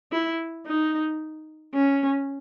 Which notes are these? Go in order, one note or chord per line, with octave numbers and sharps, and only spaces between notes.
E4
D#4
C#4